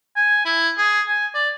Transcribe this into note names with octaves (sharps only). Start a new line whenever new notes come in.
G#5
E4
G#4
G#5
D5